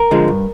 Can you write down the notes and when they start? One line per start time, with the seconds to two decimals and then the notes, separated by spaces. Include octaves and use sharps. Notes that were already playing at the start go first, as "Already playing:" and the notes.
Already playing: A#4
0.11 D3 F3 G#3
0.28 G2